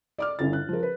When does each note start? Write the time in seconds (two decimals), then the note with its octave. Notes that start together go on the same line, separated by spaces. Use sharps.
0.18 D5 D6 F6
0.39 G1 C#4 E4 A6
0.53 F#6
0.69 F3 A#4
0.83 B4